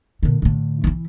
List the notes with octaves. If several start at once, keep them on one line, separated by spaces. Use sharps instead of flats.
A#2 D3
A2 D3
E3 E4